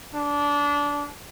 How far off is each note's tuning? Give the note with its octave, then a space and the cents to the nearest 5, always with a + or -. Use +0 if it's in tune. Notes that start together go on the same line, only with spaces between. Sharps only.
D4 -20